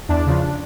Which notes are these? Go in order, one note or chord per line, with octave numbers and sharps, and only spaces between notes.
E2 D4
C#3 F3